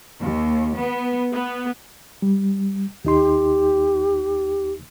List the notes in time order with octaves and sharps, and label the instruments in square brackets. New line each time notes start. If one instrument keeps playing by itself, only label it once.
[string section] D#2
B3
B3
[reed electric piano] G3
[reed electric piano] D#2 D#4 C6 [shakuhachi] G4